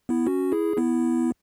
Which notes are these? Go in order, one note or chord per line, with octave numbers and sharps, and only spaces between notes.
B3 E4
C#4 F#4
E4 G#4
B3 E4